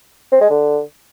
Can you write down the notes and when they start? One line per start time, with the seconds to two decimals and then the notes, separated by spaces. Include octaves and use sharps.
0.32 C4
0.41 G#3
0.50 D3